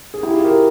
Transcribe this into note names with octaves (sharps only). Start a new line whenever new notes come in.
G#4
E4 G4
F4 G#4
G4 A#4